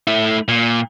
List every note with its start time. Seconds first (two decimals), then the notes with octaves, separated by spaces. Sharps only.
0.07 A3 E4
0.48 A#2